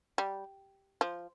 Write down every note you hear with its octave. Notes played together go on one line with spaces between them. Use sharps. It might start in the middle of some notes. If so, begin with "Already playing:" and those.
G3
F3